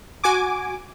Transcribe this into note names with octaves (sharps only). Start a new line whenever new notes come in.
F#4 G#5 D6